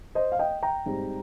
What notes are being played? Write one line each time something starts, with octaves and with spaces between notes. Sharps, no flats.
C5 D#5
F5
D#5 G5
G5 A#5
G#2 G3 C4